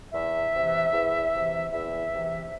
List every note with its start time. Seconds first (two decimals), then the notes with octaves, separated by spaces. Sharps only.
0.14 E2 E5
0.54 C3 E3
0.93 E2
1.33 C3 E3
1.72 E2 E5
2.12 C3 E3